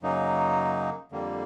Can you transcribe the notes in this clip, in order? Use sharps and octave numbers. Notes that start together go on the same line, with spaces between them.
F#2 C#3 F#3 A#3 D#4
F2 D3 G3 A#3